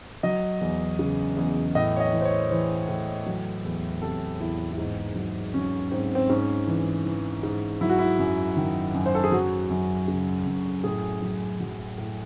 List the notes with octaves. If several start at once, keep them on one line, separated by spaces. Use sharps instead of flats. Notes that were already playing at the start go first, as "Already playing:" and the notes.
F#3 D#5
E2
C#3
E2
A2 D#5
C#5
D#5
E3
C5
C#5
E3 C5
A2
F#3
E2
C3 A4
E2 E4
E4
G#2 D#4
F#3
F#3 C#4
G#2 C4
C4
G#2 C#4
E3
E3
G#2
F#3 E4
F#4
E4
F#2
D#3
F#2
C5
A4
G#4
F#3 F#4
F#2
C#3
F#2
A2 G#4
F#3
F#3
A2